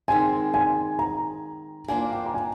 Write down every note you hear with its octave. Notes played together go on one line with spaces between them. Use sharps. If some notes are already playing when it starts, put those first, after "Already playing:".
D#3 G#3 C4 G#5
G#5
A#5
A#3 D4 F4 C5 G#5
G5
A#5
G#5